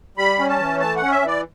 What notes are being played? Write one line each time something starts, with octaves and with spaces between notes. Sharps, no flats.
G3 B5
C#4
A5
E3
A3 A5
F#5
C#4
E5
E3 D5